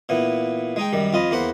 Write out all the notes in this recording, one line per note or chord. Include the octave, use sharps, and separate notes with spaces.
A#2 E3 B3
G#3 D#4 G5
F#2 D#3 G3
F2 F4 D#5 B5
E2 A#3 C5 F#5 B5